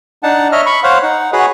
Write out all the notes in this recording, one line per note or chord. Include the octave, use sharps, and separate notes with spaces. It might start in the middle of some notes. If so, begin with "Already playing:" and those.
D4 D#4 F#5 A5
C#5 D#5 E5 F6
B5 C#6
C5 C#5 F5 F#5
D#4 F#5
F#4 G#4 B4 C#5 F#5